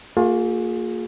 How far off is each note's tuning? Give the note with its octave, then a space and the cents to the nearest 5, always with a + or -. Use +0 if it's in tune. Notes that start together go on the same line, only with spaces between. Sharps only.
A#3 -30 F4 +35 G#4 +0